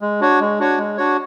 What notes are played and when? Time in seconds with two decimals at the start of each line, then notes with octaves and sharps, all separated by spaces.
0.01 G#3
0.21 D4 F#4 C#5
0.40 G#3
0.59 D4 F#4 C#5
0.78 G#3
0.97 D4 F#4 C#5